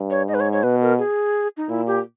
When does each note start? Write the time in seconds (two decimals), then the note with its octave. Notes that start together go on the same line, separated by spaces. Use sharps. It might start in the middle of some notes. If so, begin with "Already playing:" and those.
Already playing: G2
0.10 C#5
0.28 G#2 D#5
0.34 B4
0.40 C#5
0.52 C#5
0.63 B2 B4
0.81 A#4
0.98 G#4
1.57 D#4
1.69 A#2 E4
1.87 G4